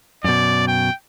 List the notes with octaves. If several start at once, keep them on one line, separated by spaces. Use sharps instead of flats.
F#2 B2 D5
G5